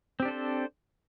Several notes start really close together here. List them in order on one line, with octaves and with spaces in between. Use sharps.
C4 G4 D4 A4 C5